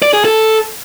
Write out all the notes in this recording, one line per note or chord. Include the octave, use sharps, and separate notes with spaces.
D5
G#4
A4